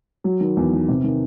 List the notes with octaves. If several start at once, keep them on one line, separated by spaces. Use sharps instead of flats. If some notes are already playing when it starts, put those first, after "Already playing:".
F#3
D#3
E2
D#3
C3
D#3